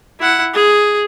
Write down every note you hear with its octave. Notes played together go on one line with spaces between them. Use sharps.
E4 F#5
G#4